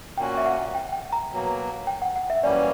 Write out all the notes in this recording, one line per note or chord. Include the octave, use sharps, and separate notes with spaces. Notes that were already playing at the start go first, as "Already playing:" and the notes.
A#2 A#3 C#4 F#4 G5
E5
F#5
G5
G5
A#5
B2 F#3 A#3
G5
F#5
F#5
E5
F#2 E3 G3 A#3 C#4 D5